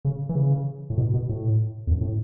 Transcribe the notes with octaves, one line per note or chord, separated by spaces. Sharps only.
C#3
E3
C#3
A2
B2
B2
A2
E2
F#2
A2